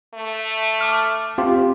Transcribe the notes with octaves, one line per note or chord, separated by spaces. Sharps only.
A3
A5 D6 F6
C4 F4 G4